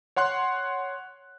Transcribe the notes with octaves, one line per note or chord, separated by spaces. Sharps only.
C#5 F#5 C6 F#6